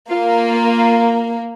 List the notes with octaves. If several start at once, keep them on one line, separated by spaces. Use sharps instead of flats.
A#3 F4